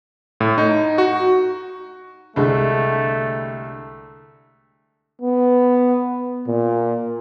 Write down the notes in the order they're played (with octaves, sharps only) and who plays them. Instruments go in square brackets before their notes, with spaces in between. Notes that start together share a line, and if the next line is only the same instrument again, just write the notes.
[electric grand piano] A2
D#4
F#4
[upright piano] C2 D3 G#3 [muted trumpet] A3
[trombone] B3
A#2